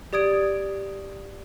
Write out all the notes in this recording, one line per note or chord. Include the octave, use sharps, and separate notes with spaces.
G4 D5 D#6 G#6 D7